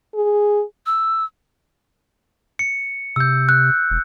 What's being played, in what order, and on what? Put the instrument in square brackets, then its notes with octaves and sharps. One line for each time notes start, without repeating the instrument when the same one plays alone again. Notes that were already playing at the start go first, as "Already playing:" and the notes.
[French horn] G#4
[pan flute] E6
[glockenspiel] C#7
[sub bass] C3 [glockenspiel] E6 G6
[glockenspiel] F#6
[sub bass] E1